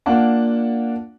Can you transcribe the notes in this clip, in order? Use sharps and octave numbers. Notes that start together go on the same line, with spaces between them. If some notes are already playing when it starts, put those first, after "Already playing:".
A#3 D4 F4 F#5 A5